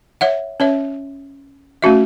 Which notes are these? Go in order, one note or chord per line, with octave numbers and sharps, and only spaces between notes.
C#5 E5 F#5
C#4 C#5 E5
A3 C#4 F#4 E5